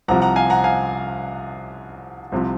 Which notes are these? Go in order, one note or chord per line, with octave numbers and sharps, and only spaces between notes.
C2 C3 F3 F#5 A#5
F#5 A#5
F5 G#5
F#5 A#5
F5 G#5
C2 C3 F3